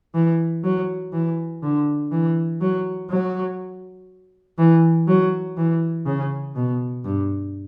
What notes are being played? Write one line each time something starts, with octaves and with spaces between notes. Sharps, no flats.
E3
F#3
E3
D3
E3
F#3
F#3
E3
F#3
E3
C#3
B2
G2